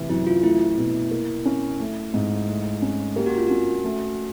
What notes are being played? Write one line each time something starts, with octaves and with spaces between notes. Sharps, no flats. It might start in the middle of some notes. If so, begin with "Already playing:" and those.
Already playing: C3 E3 A3
F#2 E4
F4
A3 E4
B2
A#3
C#4
A3
G#2
A3
C#4
A#3 G4
F#4
F4
C#4 F#4
A3